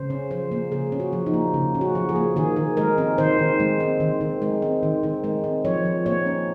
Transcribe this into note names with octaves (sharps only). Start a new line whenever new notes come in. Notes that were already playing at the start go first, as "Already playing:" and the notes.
Already playing: C#3 C5
C#4
F3 C5
A#3
C#3 G#4
C#4
F#4
F3
D#4
A#3
C#3
C#4
F#4
F3
G#4
A#3
D#3 G#4
D#3
G#3 A#4
C4
D#3 C5
D#3
G#3
C4
D#3
D#3
G#3
C4
D#3
D#3
G#3
C4
F3 C#5
F3
A#3 C#5
C#4